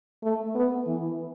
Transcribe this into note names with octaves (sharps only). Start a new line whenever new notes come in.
A3
B3
E3